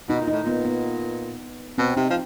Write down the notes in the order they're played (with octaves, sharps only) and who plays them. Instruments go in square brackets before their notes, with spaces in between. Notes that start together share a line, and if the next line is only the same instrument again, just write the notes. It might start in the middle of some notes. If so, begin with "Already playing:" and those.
[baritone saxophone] B2 [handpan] D#4
[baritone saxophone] A#2
[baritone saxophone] A2 [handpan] D#4
[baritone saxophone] A#2 [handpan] B3
[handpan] B3
[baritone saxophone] B2 [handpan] C4
[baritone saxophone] C3 [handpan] D#4
[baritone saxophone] F3